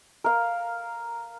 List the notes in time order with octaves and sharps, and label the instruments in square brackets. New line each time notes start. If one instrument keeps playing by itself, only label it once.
[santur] A#4 F5